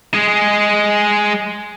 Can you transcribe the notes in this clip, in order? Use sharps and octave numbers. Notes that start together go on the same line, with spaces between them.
G#3 G#4